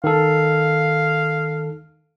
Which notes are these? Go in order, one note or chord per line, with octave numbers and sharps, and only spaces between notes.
D#3 A4 F5